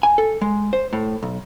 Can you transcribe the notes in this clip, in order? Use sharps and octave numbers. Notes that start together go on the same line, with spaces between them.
G#5
A4
G#3
C5
A2
B1